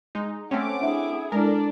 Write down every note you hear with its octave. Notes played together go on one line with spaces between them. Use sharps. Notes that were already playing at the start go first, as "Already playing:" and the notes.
G#3 D#4
A3 C4 C#4 F#5 D6
D4 E4 G#4 E5
G#3 D4 E4 A4 A#4 D5